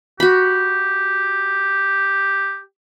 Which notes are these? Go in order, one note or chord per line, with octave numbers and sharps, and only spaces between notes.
F#4 G4 B5